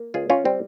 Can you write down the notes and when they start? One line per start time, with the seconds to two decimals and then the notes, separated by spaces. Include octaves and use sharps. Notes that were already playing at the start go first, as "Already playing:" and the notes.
Already playing: A#3
0.14 C#2 F4 G#4
0.30 C#4 F4
0.45 G3 C4